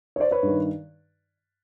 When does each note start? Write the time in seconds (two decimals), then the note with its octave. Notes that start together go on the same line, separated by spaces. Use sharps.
0.16 C#5
0.20 C5 D5
0.31 B4 C#5
0.43 G2
0.48 D#3